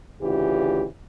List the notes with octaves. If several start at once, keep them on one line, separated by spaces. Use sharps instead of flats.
D2 C#3 E3 F4 G4